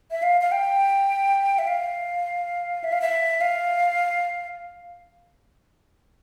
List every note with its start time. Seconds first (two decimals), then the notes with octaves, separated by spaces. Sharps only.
0.11 E5
0.22 F5
0.41 F5
0.52 G5
1.59 E5
1.67 F5
2.84 E5
2.92 F5
3.02 E5
3.41 F5